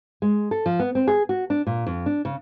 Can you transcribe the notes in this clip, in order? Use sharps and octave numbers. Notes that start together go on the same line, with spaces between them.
G#3
A4
F3
B3
C4
G#4
F#4
D4
A#2
F2
D4
C#3